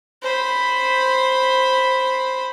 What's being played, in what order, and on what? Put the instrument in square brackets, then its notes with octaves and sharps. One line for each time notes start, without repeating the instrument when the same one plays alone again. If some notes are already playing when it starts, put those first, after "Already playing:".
[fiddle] C5 B5